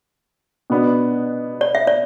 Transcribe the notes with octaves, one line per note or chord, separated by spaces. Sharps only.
B2 B3 D4
D5
E5
D5